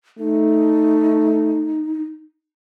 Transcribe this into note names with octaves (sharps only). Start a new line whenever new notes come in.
A3 D#4